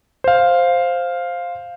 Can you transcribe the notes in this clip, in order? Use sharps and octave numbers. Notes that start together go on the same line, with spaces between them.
C5 F5